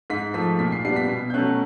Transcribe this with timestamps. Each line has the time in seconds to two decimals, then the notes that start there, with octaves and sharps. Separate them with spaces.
0.10 G#2 B6
0.34 F3 A3 B6
0.59 A#2 B6
0.72 C7
0.85 G3 B3 D4 C7
0.96 B6
1.09 B2 C7
1.30 G6
1.34 F#3 A3 C#4 F#6